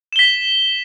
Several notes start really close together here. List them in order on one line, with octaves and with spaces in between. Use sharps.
E7 G7 B6